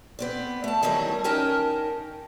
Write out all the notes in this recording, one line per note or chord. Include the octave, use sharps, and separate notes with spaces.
B3 C4 D5
A3 A5
D#3 E3 F#3 G3 E4 A#4
C#4 D#4 A#4 D#5 G5 A5